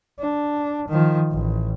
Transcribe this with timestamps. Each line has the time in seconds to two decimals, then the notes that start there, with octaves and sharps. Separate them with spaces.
0.19 D4
0.88 D#3 F3
1.31 A1